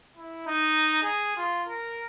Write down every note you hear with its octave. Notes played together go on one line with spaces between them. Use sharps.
E4
D#4
G#4
F4
A#4